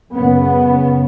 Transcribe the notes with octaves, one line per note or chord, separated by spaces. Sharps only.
F#2 C#3 B3